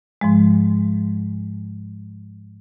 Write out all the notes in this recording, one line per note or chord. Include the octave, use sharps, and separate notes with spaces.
G#2 F3 G#3